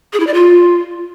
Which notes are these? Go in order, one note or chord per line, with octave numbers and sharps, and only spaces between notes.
G#4
E4
D5
F4